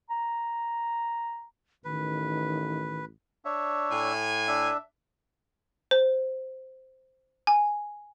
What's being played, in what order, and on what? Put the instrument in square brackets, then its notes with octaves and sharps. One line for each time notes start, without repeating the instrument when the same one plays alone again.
[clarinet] A#5
[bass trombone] A1 [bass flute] D#3 [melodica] B4
[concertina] D4 C#5 E5
[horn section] A2 G#5
[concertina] D4 E5
[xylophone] C5
G#5